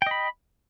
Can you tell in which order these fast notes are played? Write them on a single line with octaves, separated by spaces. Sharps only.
G5 D#5 B5